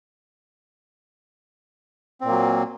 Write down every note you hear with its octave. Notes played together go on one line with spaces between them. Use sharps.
A#2 F#3 A#3 C4